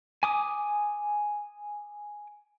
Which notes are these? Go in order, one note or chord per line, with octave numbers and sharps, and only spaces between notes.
G#5 D6 D#6